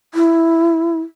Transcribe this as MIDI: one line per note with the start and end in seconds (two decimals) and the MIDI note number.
0.14 1.00 64